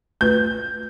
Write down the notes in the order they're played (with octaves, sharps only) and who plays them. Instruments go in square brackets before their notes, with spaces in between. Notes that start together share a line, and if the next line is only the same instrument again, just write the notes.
[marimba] A3 F4 B4 [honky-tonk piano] G6